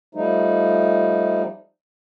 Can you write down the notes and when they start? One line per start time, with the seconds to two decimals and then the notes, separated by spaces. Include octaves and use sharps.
0.15 F3 G3 A3 D#4